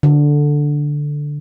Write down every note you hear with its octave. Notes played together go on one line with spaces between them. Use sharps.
D3